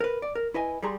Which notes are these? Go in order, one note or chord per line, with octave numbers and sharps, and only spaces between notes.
A#4 B4
D5
A#4
E4 B4 D#5 G#5
G3 G#4 A#5 C6